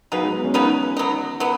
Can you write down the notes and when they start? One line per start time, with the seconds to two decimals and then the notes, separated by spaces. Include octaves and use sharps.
0.12 C#3 F#3 B3 D#4 B4
0.23 G#3
0.33 B3
0.44 C#4
0.54 C#3 B3 D#4 B4
0.97 F#3 B3 D#4
1.40 F#3 B3